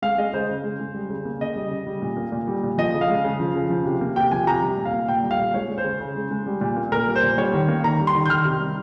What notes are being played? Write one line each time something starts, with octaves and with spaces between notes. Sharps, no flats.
G#3 F5
G#3 D#5
C#3 C5
C#3
G#3
G#3
G3
C#3
A#3
C#3 D#5
G3
C#3
G3
A#2
A#3
A#2
G3
A#2
F3 D#5
C#3
F5
G#3
C#3
F3
C#3
F3
C3
A#3
C3 G5
F3 G#5
C3 A#5
G3
A#2
F5
A#3
A#2 G5
G3
F5
A#2
G#3 C#5
G#3
C5
C#3
C#3
G#3
G#3
G3
A#2
A#3
A#2 A#4
G3
C5
A#2
G3 C#5
D#3
A#3
D#3 A#5
G3
C6
D#3
G6
D#3 F6
C3
G3